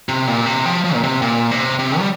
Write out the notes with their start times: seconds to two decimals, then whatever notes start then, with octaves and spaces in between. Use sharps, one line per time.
0.09 C3
0.27 A#2
0.46 C3
0.66 F3
0.84 F3
0.95 A#2
1.03 C3
1.22 A#2
1.51 C3
1.79 C3
1.99 G3